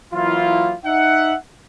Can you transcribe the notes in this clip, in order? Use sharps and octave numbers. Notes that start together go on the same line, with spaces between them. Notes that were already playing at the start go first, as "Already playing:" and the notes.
E3 F#3 A#3 E4 F4
D#4 E5 F#5